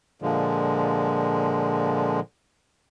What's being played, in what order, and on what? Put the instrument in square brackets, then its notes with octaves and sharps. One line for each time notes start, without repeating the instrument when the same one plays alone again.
[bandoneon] A#2 D3 F3 G#3